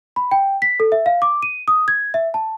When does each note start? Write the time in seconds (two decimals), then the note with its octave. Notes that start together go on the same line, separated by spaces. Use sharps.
0.16 B5
0.31 G5
0.62 B6
0.80 A4
0.92 E5
1.06 F5
1.22 D6
1.43 D#7
1.68 D#6
1.88 G#6
2.14 E5
2.34 A5